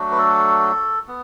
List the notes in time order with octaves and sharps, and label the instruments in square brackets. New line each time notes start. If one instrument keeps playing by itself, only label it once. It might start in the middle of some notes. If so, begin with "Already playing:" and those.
Already playing: [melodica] F#3 A3 D4 F#4
B4
A4
B3